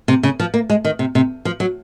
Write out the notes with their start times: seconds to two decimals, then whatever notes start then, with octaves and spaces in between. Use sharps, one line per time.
0.08 C3
0.23 C#3
0.40 F3
0.54 A#3
0.70 G#3
0.85 D#3
0.99 C3
1.15 C3
1.45 F3
1.60 F#3